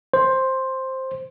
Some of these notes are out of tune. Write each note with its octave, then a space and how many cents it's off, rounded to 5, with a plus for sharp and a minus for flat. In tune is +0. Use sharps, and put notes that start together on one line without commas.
C5 +10